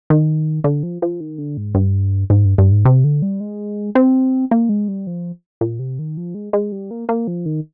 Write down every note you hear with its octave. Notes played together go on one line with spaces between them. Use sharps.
D#3
D3
F3
F3
D#3
D3
G#2
G2
G#2
G2
G2
G#2
C3
D3
G3
G#3
C4
A#3
G#3
G3
F3
A#2
C3
D#3
F3
G#3
G#3
G3
A#3
A#3
F3
D#3